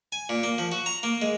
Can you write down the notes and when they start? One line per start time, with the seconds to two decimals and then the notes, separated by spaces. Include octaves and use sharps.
0.12 G#5
0.29 A#2
0.43 A#3
0.58 F3
0.72 F#4
0.86 A#5
1.03 A#3
1.22 G#3